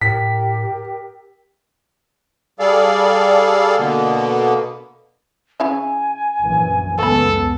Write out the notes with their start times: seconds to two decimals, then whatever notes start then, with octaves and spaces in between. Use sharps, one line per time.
0.01 A2 G4 A#4 G5 B6
2.59 G3 G#4 A4 D5 F5
3.79 B2 D3 A#3 B3
5.60 C#3 E4 E5 G#5
6.40 A#1 F#2 E3
6.99 C#2 F#2 A3 B3 A4 B5